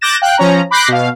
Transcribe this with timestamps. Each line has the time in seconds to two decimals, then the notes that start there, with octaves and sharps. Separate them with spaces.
0.01 D6 F#6 G6 A6 A#6 E7
0.22 F5 G5 F#6
0.38 F3 C#4 A#5
0.71 B5 D6 F#6 G6 A#6 C7
0.88 B2 F5